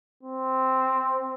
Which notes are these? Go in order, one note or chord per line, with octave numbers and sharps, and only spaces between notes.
C4